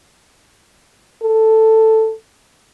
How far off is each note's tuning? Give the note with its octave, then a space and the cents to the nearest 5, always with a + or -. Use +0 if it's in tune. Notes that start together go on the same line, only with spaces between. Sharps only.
A4 +5